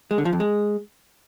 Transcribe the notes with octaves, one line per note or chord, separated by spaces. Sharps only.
G#3
D3
F3
F2
G#3